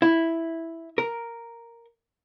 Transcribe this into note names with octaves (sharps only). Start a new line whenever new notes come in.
E4
A#4